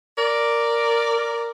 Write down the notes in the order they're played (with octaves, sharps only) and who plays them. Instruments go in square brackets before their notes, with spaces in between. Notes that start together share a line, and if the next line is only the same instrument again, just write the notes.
[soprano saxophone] A#4 [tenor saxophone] D5
[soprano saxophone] A#4